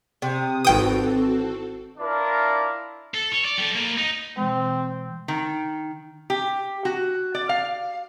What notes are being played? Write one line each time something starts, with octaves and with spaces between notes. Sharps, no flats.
C3 D#6
G#1 E3 C4 F#4 A4 G5 D#6
D4 E4 F4 A#4 D5
A4
C#5
D5
G3 A4
A#3 B4
D#4
B2 E3 G#3 C4
D#3
G4
F#4
D5
F5